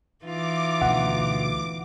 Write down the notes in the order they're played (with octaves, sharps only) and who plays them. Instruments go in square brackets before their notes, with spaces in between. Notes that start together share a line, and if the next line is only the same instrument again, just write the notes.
[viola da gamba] E3 D#4 F4 [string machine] D6
[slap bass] D2 B2 [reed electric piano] F#5